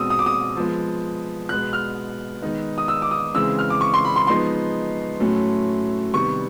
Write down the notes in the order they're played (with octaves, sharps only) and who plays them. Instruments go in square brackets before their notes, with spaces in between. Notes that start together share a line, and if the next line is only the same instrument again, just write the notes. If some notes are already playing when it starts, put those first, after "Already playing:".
Already playing: [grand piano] B2 G#3 C4 D#6 E6
D#6
D6
D#6
F3 G#3 B3
B2 G#3 B3 F#6
F6
D#3 G#3 B3 D#4
D#6
E6
D6
D#6
C#3 E3 G#3 C4 E6
F6
D6
C#6
C6
B5
C6
F3 G#3 B3 D#4 C6
A2 F#3 A3 C#4
C3 D#3 G3 B3 C#6